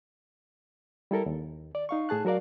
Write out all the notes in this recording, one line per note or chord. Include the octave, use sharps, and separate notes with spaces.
G3 E4 A4 A#4
D#2
D5
D#4 F5 C#6
A2 G#4 A5 F#6
F#3 F#4 A#4 D5 F5